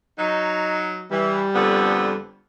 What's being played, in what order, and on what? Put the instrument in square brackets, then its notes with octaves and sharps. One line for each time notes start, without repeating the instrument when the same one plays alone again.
[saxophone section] F#3 D#4
[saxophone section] E3 [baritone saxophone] G3
[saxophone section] F2 D3 B3